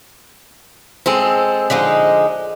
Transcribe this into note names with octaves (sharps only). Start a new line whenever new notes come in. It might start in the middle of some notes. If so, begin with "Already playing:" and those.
G#3 C4 A4
D3 F3 G#3 D#4